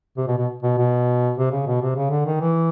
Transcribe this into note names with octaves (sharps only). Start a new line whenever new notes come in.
C3
B2
B2
B2
B2
C3
C#3
B2
C3
C#3
D3
D#3
E3